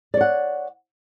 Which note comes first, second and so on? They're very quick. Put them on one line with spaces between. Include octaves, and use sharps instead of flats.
D5 C#5 F#5